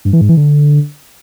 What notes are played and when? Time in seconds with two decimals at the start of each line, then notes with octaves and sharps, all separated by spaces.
0.05 G2
0.13 E3
0.21 G#2
0.29 E3
0.37 D3